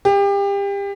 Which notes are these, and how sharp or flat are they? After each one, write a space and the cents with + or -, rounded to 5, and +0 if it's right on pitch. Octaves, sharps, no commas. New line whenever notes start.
G4 +30